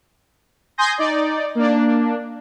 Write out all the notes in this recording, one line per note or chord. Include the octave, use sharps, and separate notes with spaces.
G#5 C6 D#6 G6 A#6
D#4 D5
A#3 D4